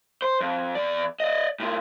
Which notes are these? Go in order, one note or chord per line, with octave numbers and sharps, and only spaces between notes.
C5
F2
E2 D5
D5 D#5
A2 F4